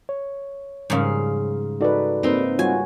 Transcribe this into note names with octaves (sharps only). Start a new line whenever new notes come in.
C#5
G#2 C#3 F3 G3 F5
D#4 F#4 A4 B4 D5
A#3 C4 D#4 B4
G3 F4 F#4 C#5 G#5